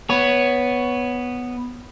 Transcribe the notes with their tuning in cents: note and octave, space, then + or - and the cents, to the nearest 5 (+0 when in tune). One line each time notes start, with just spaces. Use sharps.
B3 +0 C#5 +10